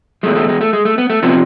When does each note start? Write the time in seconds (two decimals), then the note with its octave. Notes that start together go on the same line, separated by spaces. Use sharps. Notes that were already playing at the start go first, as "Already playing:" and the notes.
0.23 E2 B2 G#3 A3
0.36 A3
0.49 G#3
0.61 A3
0.73 G#3
0.85 A3
0.98 B3
1.10 A3
1.23 C3 F3 B3